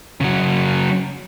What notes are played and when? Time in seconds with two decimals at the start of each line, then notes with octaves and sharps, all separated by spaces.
0.21 C#3 F#3